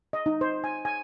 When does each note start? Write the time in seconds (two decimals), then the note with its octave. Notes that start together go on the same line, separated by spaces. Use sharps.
0.13 D#5
0.26 D#4
0.41 C5
0.64 G#5
0.85 G#5